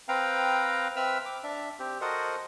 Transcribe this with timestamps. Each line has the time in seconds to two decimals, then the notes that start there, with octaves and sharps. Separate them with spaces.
0.09 C4 B4 F5 G5 A#5
0.96 C4 B4 E5 B5 E6 F6
1.26 D6
1.43 D4 E5
1.80 C4 G4
2.01 F#4 A4 A#4 C5 D#5 F#5